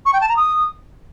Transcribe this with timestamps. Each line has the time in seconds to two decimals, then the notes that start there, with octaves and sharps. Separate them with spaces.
0.06 C#6
0.13 G5
0.21 A5
0.29 A#5
0.36 D#6